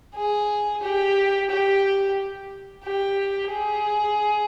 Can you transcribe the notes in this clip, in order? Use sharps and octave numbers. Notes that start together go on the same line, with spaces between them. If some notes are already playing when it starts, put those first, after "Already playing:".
G#4
G4
G4
G4
G#4